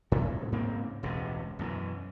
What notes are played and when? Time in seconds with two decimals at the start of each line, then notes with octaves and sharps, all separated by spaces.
0.12 A2 C3 F#3 G#3
0.52 G#2 C#3 A#3 C4
1.03 E1 C#2 A2 C3
1.59 F#2 B2 D3 E3